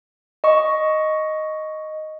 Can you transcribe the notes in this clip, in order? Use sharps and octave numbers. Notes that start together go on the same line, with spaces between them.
D#5 C#6